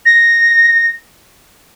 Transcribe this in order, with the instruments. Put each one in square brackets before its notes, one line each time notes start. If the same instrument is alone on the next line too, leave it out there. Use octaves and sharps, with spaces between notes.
[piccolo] A#6